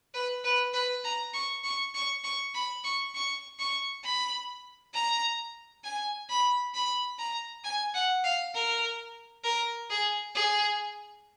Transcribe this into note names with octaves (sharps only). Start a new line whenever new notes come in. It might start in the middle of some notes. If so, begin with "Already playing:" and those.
B4
B4
B4
A#5
C#6
C#6
C#6
C#6
B5
C#6
C#6
C#6
B5
A#5
G#5
B5
B5
A#5
G#5
F#5
F5
A#4
A#4
G#4
G#4